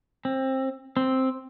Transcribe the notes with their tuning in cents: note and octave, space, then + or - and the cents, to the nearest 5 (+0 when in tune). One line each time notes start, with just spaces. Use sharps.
C4 +20
C4 +0